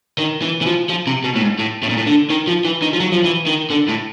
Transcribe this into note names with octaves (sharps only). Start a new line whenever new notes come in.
D#3
E3
E3
F3
F3
C3
B2
A2
G#2
A2
A2
A#2
A2
D3
D#3
F3
E3
D#3
F3
F#3
F3
E3
D#3
D3
A2